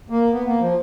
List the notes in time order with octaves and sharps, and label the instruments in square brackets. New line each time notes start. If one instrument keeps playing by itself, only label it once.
[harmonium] A#3
B3
A#3
F3